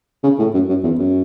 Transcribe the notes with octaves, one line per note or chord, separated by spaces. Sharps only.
C#3
A2
F#2
F#2
E2
F#2